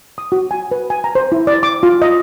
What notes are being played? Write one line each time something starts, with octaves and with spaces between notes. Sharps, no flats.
D#6
F#4
G#5
B4
G#5
A#5
C5
E4
D5
D6
F4
D#5